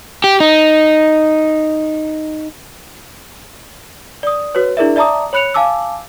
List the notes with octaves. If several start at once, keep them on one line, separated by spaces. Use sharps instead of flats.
G4
D#4
D5 D#6
F#4 B4 C#5
D4 E4 G#4 A#4 D5 E5
D5 E5 A5 A#5 D6 D#6
C#5 B5 F#6 C#7 F7
F5 G#5 A5 D6 E6